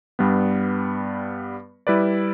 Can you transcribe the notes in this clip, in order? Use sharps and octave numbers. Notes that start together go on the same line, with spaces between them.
G2 G3 B3
G3 E4 B4 D5